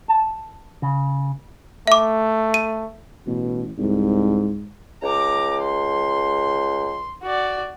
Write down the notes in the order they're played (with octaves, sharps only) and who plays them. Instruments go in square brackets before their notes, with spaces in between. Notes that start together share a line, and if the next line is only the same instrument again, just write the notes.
[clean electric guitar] A5
C#3
[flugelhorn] A3 [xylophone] E5 D6
[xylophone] D#7
[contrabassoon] A1 [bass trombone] B2
[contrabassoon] C2 [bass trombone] G#2
[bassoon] C#2 [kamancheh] A#5 D6
[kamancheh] C6
F#4 D5